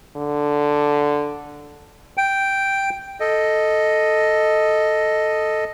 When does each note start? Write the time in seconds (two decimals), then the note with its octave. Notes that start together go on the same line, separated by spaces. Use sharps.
0.16 D3
2.17 G5
3.20 A4 D#5